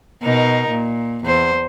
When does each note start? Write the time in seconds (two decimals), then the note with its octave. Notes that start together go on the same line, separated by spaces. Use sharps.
0.23 B2 D#4 A#4
0.69 A#2
1.24 E2 C5